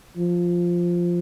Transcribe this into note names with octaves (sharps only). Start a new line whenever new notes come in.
F3